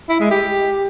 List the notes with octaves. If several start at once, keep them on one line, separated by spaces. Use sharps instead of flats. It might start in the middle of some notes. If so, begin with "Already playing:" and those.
E4
G#3
G4